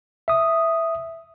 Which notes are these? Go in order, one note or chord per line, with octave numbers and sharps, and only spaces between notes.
E5 D#6